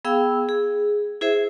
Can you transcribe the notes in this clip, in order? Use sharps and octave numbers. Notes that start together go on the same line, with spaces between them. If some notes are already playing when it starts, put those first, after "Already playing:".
B3 G#4 F5 G5 E6
G#4
E4 G#4 C5 E5